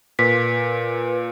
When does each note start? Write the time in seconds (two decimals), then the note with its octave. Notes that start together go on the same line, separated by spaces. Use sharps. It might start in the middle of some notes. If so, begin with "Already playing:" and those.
0.19 A#2 B4 B6